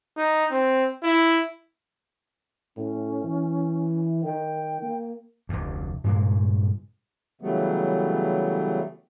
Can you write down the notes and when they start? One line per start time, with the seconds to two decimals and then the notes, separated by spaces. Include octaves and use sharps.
0.17 D#4
0.52 C4
1.04 E4
2.77 A2 C#4
3.24 E3
4.23 D#3 G5
4.82 A#3
5.49 F1 D2
6.04 G2 A#2 C#3 G#3
7.41 C#3 E3 F#3 G3 A3 B3